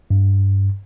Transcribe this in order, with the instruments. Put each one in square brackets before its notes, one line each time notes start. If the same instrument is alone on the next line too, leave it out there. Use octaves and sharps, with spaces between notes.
[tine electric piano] G2